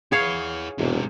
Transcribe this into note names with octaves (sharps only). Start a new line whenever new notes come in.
E4 G#4 C#5 F5 F#5
E1 G#2 C3